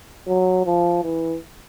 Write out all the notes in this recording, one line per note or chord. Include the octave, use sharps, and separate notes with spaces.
F#3
F3
E3